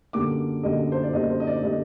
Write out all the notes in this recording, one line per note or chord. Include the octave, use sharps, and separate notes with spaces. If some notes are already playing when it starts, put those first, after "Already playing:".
F#2 D3 G3 A#3 D6
F#2 D3 G3 A#3 D#5
C5
D5
F#2 D3 G3 A#3 D#5
C5
D#5
D5
D3 G3 A#3 D#5